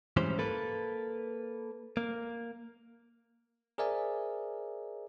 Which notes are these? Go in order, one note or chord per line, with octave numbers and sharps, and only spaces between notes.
G#2 E3 G3 C#4 C5
A#3 A4 B4
A#3
G#4 A#4 C5 D5 E5 G#5